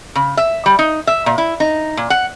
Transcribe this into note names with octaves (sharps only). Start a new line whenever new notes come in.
C#3
E5
G3
D#4
E5
A#2
E4
D#4
A#2
F#5